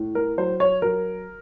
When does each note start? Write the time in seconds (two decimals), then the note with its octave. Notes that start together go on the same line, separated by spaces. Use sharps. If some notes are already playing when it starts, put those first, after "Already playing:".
Already playing: A2
0.15 A#4
0.37 F#3 C5
0.60 C#5
0.82 F#3 A#4